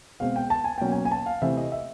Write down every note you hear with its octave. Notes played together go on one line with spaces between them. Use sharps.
B2 G#3 C4 F5
G5
A5
G#5
B2 F#3 A#3 C#4 G5
G#5
G#5
A5
F5
C3 E3 A3 C4 E5
D#5
E5